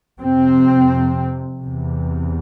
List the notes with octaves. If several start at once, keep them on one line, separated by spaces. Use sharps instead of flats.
F2 C3 C4
E2 C3